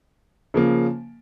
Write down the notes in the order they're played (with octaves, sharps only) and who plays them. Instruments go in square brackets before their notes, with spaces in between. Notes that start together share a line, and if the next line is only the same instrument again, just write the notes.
[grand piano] C#3 F3 A#3